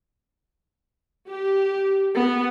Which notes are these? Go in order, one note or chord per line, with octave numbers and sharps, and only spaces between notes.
G4
B3